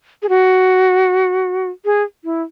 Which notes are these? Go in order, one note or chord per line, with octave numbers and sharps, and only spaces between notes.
G#4
F#4
G#4
E4